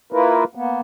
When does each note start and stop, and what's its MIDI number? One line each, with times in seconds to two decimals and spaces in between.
0.12 0.44 58
0.12 0.44 64
0.12 0.44 65
0.12 0.44 70
0.12 0.44 71
0.55 0.81 58
0.55 0.81 59